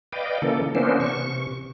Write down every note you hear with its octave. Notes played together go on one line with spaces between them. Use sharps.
B4 D5 D#5 F5 G5
C#3 E3 A#3 A4
E3 A#3 B3 C#4 D4 C5
C3 C#6